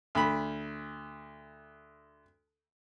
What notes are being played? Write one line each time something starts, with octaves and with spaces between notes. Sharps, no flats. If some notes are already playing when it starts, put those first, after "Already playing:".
D2 B5